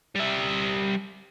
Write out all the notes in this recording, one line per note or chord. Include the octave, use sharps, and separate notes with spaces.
G3 E5